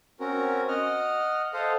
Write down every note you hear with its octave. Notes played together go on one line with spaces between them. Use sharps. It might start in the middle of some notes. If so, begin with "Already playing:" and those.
C4 C#4 F#4 A#4
D#5 F#5 F6
A4 C5 D#5 F5 F#5